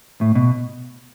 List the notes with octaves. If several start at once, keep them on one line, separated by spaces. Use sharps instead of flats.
A2
B2